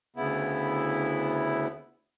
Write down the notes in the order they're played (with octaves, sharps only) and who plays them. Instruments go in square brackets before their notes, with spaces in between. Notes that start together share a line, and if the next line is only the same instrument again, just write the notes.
[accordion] D2 C#3 B3 E4